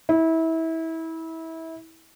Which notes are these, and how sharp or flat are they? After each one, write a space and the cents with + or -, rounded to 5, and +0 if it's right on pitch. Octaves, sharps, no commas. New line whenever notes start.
E4 -25